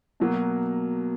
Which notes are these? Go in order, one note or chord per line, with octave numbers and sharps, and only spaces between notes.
B2 F#3 A#3